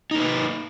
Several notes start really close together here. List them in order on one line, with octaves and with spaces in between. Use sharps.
D#4 A#3 B4